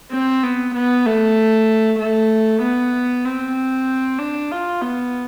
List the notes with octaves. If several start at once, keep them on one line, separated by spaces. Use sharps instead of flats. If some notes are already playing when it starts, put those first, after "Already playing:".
C4
B3
B3
A3
A3
B3
C4
D4
F4
B3